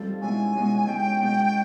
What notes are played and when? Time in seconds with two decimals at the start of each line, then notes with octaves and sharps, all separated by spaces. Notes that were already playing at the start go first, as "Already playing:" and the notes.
Already playing: G3 C4 D#4 F4 A4
0.21 B2 G#3 C#4 E4 G#5
0.55 B2 G#3 C#4 E4
0.87 B2 G#3 C#4 G5
1.21 B2 G#3 C#4